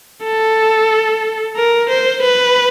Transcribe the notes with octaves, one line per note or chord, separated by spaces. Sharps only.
A4
A#4
C5
B4